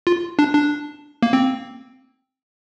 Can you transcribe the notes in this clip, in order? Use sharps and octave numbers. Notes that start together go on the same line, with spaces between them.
F4
D4
D4
A#3
C4